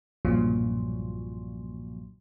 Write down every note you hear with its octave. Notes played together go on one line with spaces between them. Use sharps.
B1 G2 A#2 C#3 F3 F#3